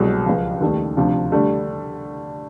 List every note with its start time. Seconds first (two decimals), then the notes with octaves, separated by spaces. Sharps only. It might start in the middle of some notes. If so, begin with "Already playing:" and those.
Already playing: C2 B2 F#3 G#3
0.26 C#2 C#3 F3
0.61 D#2 D#3 G3 A3
0.97 D2 C3 F3
1.32 D3 G3 A3